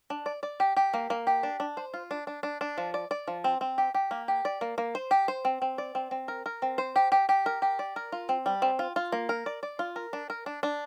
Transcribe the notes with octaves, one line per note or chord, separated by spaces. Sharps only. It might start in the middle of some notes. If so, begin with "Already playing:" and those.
D4
D5
D5
G4
G4
A#3
A#3
G4
D4
D4
C5
F4
D4
D4
D4
D4
F3
D5
D5
F3
C4
C4
G4
G4
A#3
G4
D5
A#3
A#3
C5
G4
C5
C4
C4
D5
C4
C4
A#4
A#4
C4
C5
G4
G4
G4
A#4
G4
D5
A#4
F4
C4
G3
C4
F4
F4
A#3
A#4
D5
D5
F4
A#4
D4
A#4
D4
D4